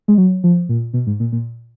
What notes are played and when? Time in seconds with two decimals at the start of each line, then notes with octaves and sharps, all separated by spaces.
0.08 G#3
0.18 F#3
0.44 F3
0.69 A#2
0.93 B2
1.07 G#2
1.20 A#2
1.32 A#2